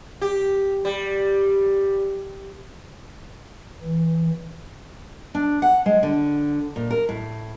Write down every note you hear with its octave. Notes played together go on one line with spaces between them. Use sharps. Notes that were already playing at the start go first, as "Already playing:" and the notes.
G4
G3
E3
D4
F#5
G#3
D3
A#2
A#4
A2